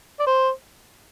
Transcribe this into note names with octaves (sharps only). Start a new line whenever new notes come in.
D5
C5